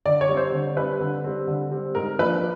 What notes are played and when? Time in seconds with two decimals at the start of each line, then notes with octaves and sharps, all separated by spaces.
0.06 D3 D5
0.21 C#5
0.29 G3 C4
0.37 C5
0.52 D3
0.76 G3 C4 B4
1.01 D3
1.24 G3 C4
1.47 D3
1.71 G3 C4
1.95 G#2 A#4
2.19 F3 A#3 D4 B4